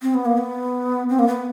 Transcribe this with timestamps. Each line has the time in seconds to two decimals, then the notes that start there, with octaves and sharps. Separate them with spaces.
0.02 C4
0.14 B3
0.25 A#3
0.37 B3
1.09 C4
1.19 A#3
1.27 B3